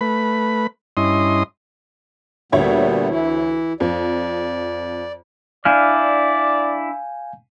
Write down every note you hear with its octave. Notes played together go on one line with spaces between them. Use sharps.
A3 B4 B5
G2 C#4 E4 D#5 C6 D#6
D2 A#2 G3 B3 C#5 E5
E3 E4
F2 D5
D4 E4 D5 F5 G#5 F6 G6